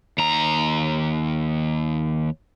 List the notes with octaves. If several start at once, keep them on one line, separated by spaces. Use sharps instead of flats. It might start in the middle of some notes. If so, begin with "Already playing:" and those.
D#2 A#5